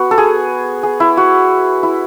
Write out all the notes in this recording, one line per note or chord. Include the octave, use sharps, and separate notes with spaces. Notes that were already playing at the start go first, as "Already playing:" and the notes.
Already playing: B3 F#4
A4
G#4
G#4
E4
F#4
E4